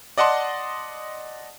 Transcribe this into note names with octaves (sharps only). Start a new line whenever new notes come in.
D5 D#5 F#5 A5 C6